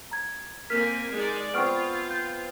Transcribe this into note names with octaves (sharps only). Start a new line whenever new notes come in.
A#5 G#6
A#3 C4 A#4 G#5 F6 B6
G#3 D#4 D5
B3 C4 F4 C#6 F6 D7
G6